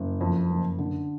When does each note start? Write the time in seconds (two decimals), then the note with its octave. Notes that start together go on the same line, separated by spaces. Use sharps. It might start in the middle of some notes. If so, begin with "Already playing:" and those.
Already playing: F#1
0.21 F2
0.50 F#1
0.79 D3